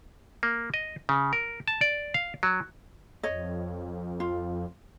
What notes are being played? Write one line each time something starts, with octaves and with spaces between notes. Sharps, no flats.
A#3
D#5
C#3
A#4
A5
D5
F5
F#3
F2 C#5 D#5
F4